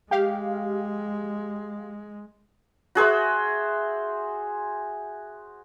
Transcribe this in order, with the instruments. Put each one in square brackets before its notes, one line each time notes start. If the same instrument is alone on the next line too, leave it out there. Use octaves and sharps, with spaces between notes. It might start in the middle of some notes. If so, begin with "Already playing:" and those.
[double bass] G#3 [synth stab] G4 F5
[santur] F#4 G#4 C5 E5